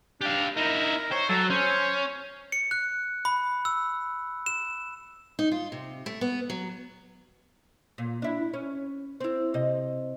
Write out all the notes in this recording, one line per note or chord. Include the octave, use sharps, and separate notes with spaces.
D4 G4 F5
D#4 E4 A#4
C5 C#5
F#3 A4
C#4 C5
C#7
F#6
B5
E6
E7
D#4
F4
C3
A3
B3
F#3
A#2
D4 E4
C#4
C4 E4
C3 D#5